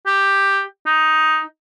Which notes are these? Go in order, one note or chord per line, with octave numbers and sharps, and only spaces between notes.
G4
D#4